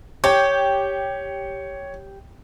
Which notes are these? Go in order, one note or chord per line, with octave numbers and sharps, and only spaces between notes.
G4 C#5